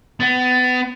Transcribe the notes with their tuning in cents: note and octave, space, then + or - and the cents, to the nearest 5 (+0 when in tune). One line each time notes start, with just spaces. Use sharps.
B3 +30